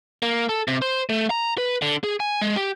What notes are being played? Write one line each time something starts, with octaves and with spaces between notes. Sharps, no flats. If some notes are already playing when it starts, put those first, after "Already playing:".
A#3
A4
C3
C5
A3
A#5
B4
D3
G#4
G#5
G#3
G4